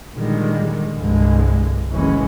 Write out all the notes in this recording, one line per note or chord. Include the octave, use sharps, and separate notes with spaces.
A#2 D3 D#3 G3 G#3
C2 G2 D3 G#3
F#1 A2 E3 G#3 C#4